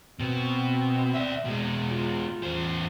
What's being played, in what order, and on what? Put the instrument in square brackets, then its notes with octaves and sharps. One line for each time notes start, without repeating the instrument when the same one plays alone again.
[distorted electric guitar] B2 [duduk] C4
[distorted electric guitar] D5 E5
B2 G#3
[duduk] F4
[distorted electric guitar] E2 C5